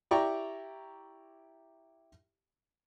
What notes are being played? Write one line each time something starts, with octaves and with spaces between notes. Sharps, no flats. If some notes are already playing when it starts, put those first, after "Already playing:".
E4 G4 D5 G5 A#5 C#6